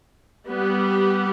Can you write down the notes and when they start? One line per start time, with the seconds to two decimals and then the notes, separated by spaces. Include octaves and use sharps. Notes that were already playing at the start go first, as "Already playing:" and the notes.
0.47 G3 B3 G4